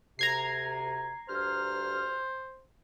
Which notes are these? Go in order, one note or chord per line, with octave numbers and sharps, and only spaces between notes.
D2 C3 A#5 G#6 C7
D2 G2 C5 F6